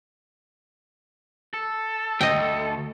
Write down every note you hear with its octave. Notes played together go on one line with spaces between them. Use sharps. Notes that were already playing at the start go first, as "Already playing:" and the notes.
A4
D2 D#5 G5